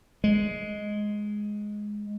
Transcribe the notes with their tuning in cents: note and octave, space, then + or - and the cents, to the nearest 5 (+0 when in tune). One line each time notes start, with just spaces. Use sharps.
G#3 +5